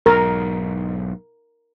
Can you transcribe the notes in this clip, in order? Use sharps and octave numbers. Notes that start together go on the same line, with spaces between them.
B1 G#2 A#4